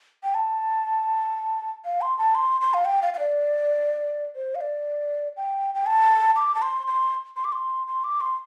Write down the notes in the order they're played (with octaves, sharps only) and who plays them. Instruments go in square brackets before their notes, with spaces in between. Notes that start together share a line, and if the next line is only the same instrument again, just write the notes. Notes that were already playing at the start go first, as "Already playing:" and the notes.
[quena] G5
A5
F5
C6
A5
C6
C6
F5
G5
F5
F5
D5
C5
F5
D5
G5
G5
A5
D6
A5
C6
C6
C6
D6
C6
C6
D6
C6